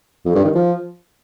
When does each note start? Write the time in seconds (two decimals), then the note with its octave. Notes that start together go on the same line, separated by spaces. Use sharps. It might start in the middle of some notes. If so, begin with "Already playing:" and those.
0.25 F2
0.35 G2
0.45 D#3
0.55 F3